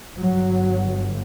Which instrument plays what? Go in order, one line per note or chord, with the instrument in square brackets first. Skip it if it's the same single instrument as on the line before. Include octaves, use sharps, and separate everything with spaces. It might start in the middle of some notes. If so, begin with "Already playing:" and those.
[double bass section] G1 G2 F#3